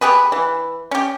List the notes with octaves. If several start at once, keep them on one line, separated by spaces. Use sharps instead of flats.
B3 G4 G#4 B4
E3
C#4 G4